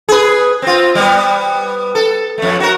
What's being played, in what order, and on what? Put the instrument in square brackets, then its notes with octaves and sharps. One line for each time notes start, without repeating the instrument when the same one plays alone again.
[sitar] G#4 B4
C4 F4
G3 B3
A4
F2 A3
F#4 A#4